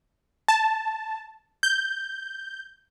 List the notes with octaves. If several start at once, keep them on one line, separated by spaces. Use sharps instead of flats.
A5
G6